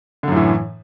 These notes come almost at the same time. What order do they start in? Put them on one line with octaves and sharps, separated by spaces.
D3 F#2 A2 E3